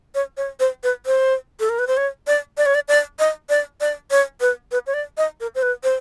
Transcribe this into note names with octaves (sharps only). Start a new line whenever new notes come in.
C#5
C#5
C5
B4
C5
A4
A#4
B4
C5
C#5
D5
D5
C#5
D5
D5
D#5
D5
D5
C#5
B4
B4
C#5
D5
D#5
A#4
C5
B4
C5